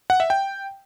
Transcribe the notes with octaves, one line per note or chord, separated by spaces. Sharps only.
F#5
E5
G5